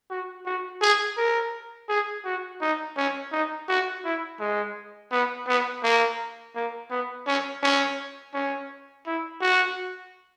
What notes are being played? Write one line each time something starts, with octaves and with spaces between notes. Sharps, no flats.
F#4
F#4
G#4
A#4
G#4
F#4
D#4
C#4
D#4
F#4
E4
G#3
B3
B3
A#3
A#3
B3
C#4
C#4
C#4
E4
F#4